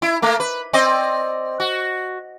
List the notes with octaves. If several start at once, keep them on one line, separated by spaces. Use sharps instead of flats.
E4
A3 A#3
B4
C4 D5 D#5
F#4